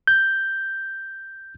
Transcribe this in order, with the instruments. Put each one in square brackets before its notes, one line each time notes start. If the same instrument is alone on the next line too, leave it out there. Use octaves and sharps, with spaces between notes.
[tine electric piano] G6